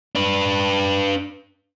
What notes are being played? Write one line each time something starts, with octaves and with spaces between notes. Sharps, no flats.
D4 B4